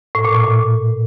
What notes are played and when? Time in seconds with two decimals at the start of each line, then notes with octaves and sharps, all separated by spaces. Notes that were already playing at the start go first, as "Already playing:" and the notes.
0.15 A2
0.25 A#2
0.34 A2
0.44 A#2